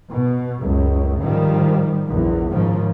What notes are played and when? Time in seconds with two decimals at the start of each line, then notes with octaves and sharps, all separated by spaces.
0.11 B2
0.61 C#2 F#2
1.22 G#2 D#3 F3 G3
2.08 A#1 E2
2.51 D#2 G#2 C#3 F3